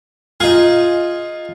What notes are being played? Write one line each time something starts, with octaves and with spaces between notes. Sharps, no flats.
D#4 F4 G#4